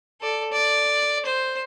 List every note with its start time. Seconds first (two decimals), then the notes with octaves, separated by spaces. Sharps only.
0.21 A4 D5
0.52 D5
1.26 C5